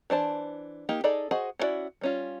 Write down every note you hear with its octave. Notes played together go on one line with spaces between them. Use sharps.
E3 D4 C5 A5
A#3 D#4 G4
D#4 G#4 A4 D5 D#5
F#4 G#4 C5 D#5
C#4 D4 E4 F#4 D5
G3 C#4 F4